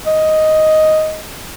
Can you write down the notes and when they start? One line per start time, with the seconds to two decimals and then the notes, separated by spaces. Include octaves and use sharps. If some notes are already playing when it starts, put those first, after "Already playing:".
0.07 D#5